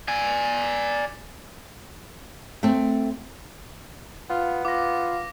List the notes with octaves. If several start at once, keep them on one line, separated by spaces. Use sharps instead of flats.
D5 G#5
A3 C4
B3 F4
F4 D6 A#6